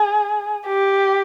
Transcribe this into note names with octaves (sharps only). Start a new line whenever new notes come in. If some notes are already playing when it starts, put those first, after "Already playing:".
Already playing: G#4
G4